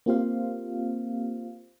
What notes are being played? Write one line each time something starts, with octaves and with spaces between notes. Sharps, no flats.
A#3 C4 F4 G4 C5 F5